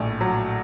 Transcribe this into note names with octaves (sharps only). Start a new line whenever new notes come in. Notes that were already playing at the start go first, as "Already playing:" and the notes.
Already playing: A#1 A2 A3
F#3